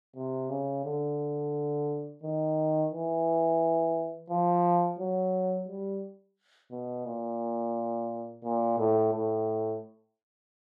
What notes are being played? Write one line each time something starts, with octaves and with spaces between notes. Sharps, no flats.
C3
C#3
D3
D#3
E3
F3
F#3
G3
B2
A#2
A#2
A2
A2